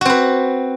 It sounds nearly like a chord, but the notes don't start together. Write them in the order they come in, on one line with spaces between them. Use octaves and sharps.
F#4 C4 B4